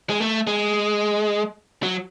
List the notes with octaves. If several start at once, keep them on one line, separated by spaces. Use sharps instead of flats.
G#3
A3
G#3
F#3